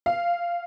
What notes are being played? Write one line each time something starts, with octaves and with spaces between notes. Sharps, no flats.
F5